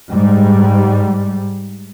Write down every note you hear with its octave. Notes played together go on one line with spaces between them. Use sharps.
G#2 G3